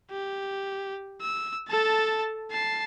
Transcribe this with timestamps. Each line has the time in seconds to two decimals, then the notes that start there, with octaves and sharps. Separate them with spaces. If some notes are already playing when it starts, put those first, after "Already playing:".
0.11 G4
1.21 E6
1.69 A4 A5
2.51 A5 C7